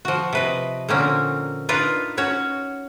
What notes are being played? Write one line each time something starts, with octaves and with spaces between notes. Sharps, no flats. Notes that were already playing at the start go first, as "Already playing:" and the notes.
F3 F#4
C3 B4 D#5
A#2 D3 A#3 C4 C#4 A#4
D4 D#4 F4 A#4 B4
C#4 F#4 C#5